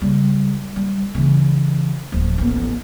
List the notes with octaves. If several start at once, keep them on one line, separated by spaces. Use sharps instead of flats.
C#3 G3
G3
C#3 E3
D1 F3
A1 B3